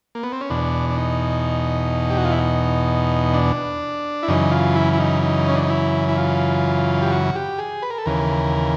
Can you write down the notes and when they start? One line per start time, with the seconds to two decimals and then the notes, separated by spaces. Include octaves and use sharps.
0.15 A#3
0.23 B3
0.32 C4
0.41 C#4
0.50 E2 B2 D4
0.90 D4
0.97 D#4
2.10 G4
2.18 F#4
2.25 F4
2.32 E4
2.38 D#4
3.34 D4
4.23 E4
4.28 F#2 C#3 E3 D#4
4.51 F4
4.75 E4
4.93 E4
4.99 D#4
5.23 D#4
5.48 C#4
5.56 D4
5.63 D#4
5.70 E4
6.08 E4
6.18 F4
7.02 G4
7.11 F#4
7.35 G4
7.58 G#4
7.82 B4
7.90 A#4
7.98 A4
8.06 D#2 C#3 E3 A#4